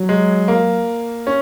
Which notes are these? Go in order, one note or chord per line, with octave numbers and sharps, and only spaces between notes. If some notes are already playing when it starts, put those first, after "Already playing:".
Already playing: F#3
G#3
A#3
C#4